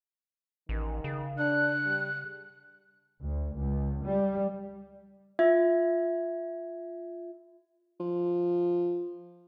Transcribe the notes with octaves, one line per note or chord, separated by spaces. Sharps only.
A1 D#3
C#3
D4 F#6
G3
D2
C#2
G3
F4 E5 G#6
F3